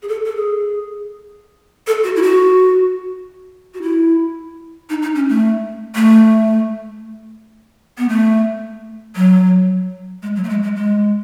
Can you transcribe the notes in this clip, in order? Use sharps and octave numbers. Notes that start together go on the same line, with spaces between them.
G#4
A4
A4
G#4
A4
F#4
E4
F#4
F#4
E4
D#4
D#4
C#4
A3
A3
B3
A3
F#3
G#3
F#3
A3
G#3
G#3
G#3